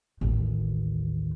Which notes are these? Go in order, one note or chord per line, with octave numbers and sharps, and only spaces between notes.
A1 D#2